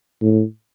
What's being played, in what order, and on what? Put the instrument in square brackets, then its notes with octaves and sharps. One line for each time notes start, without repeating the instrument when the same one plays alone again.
[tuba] A2